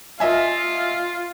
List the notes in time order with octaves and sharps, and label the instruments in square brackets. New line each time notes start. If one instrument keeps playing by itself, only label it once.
[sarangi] F4 [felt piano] D#5 E5 G#5